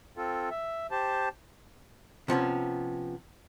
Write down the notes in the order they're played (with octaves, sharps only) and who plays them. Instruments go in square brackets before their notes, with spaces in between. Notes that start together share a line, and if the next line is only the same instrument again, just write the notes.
[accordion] C4 F4 A4
E5
G4 C5 A5
[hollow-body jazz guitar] C3 F3 B3 C#4